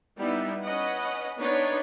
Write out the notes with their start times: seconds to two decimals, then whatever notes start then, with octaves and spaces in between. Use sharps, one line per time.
0.19 G3 B3 D#4 E4
0.63 C#4 B4 D#5 F#5
1.38 B3 D4 D#4 B4 C#5